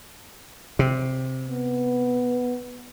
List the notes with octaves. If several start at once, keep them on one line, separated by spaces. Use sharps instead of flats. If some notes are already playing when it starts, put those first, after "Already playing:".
C3
B3